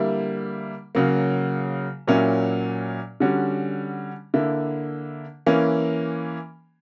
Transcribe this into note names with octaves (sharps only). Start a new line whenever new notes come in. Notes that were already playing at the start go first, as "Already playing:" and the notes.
Already playing: D3 G3 A#3 E4
C#3 F#3 A#3
A#2 F#3 A#3 C#4 E4
D3 G3 C#4 F#4
D3 A#3 E4
E3 A#3 C#4